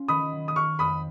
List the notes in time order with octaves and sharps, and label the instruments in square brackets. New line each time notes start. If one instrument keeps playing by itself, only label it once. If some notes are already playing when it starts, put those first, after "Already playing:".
Already playing: [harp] C#4 F4
[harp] D#3 [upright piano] B5 D#6
[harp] F#3
[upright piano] D#6
[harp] F#3 [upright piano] C#6 F6
[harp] F2 [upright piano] B5 D#6